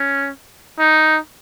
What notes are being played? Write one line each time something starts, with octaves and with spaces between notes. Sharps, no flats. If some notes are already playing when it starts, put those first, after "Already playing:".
Already playing: C#4
D#4